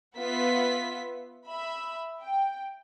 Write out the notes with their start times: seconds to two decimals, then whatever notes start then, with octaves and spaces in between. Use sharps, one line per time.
0.17 B3 F4 B4 E5 F#5 B6
1.46 E5 B5
2.22 G5